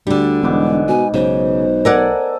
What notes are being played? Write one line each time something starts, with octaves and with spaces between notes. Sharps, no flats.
D2 D3 G3
E1 G#2 B3 D6
B2 G#5
B1 C#3 C5
A4 A#4 D5 F#5 G#5